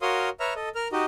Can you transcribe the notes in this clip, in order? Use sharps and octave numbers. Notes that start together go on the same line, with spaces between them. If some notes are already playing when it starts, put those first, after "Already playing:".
F#4 A#4 C#5 F5 C6 D#6
B4 C#5 E5 A#5 F6
A4 D#5
A#4 F6
D#4 F#4 G4 D#5